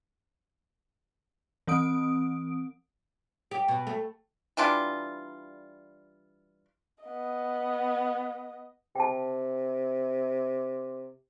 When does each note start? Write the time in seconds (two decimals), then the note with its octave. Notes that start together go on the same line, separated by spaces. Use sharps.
1.67 E3 C4 D#6 D7
3.51 G4
3.68 B2
3.87 A3
4.57 E3 G3 D4 F4
7.04 B3 D#5
8.95 C3 G5 A5